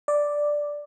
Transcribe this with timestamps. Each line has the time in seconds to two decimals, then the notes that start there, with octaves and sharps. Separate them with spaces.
0.08 D5